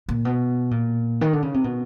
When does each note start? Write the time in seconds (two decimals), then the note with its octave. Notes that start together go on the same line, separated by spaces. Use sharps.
0.09 A#2
0.25 B2
0.71 A#2
1.21 D#3
1.33 D3
1.42 C#3
1.54 C3
1.64 B2